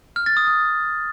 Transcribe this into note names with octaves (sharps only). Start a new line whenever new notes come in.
F6
A6
D#6
D#6